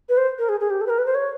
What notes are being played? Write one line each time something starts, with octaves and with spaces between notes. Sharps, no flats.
B4
C5
A#4
G#4
G#4
G4
A4
B4
A#4
B4
C5
C#5